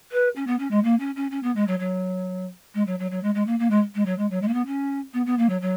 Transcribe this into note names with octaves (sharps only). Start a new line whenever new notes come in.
B4
C#4
B3
C#4
G#3
A#3
C#4
C#4
C#4
B3
G#3
F#3
F#3
G#3
F#3
F#3
F#3
G#3
G#3
A#3
A#3
G#3
G#3
F#3
G#3
F#3
G#3
A#3
B3
C#4
B3
B3
A#3
F#3
F#3